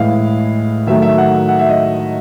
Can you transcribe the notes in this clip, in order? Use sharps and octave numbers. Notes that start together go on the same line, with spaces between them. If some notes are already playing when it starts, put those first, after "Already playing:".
Already playing: A2 E3 G#3 F5
D#3 F#3 A3 E5
E5
F#5
F#5
E5
D#5